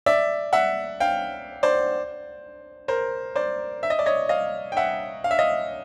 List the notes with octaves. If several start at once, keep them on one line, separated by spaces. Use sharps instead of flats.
D5 E5
E5 F#5
F5 G5
C5 D5
A#4 C5
C5 D5
E5
D#5
D5
C#5 D#5
D#5 F5
G5
E5 F#5
F5
E5
D#5 F5